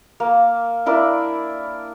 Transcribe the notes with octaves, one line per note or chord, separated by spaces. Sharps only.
A#3
D4 E4 A#4 D5